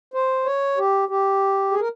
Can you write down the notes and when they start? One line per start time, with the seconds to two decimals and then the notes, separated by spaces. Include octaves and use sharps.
0.14 C5
0.46 C#5
0.78 G4
1.09 G4
1.72 G#4
1.80 A#4